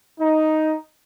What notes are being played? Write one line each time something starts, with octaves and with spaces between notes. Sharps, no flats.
D#4